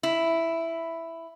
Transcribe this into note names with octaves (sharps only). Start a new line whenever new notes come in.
E4